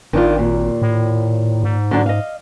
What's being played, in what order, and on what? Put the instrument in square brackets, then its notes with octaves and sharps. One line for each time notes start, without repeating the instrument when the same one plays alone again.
[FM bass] G#1 [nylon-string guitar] D#3 D4 F4
[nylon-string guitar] D#2 A#2
[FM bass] A2
G#2
[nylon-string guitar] D3 F#3 D4
D#5 F5